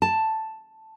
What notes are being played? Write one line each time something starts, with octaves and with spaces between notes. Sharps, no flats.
A5